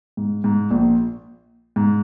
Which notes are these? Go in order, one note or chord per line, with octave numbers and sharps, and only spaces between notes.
G#2
G#2
A#1 A#2
G#2